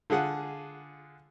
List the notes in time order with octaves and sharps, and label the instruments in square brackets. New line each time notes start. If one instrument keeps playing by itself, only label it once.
[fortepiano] D3 F4 G#4 F#5